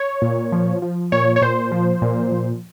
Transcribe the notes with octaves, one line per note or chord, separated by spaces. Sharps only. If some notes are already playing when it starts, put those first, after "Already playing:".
Already playing: C#5
A#2
F3
F3
A#2 C#5
C#5
A#2 C5
F3
A#2
F3